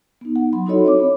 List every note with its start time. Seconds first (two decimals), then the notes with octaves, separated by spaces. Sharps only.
0.21 B3 D#4
0.36 F#5
0.52 F#3 B5 C6
0.66 D#4 E4 F#4 A4 C#5 D#5
0.84 C4 C#5 D6
1.00 B5